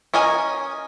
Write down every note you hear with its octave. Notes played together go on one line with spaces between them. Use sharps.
C#4 A#4 D#5 G#5